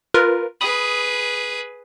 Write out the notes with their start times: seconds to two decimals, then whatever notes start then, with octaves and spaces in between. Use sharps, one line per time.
0.14 F4 A#4 B4
0.61 G#4 B4 B5 D#6